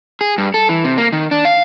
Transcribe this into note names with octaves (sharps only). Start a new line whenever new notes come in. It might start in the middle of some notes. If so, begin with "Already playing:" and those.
G#4
G2
A4
E3
C3
A#3
D#3
D4
F5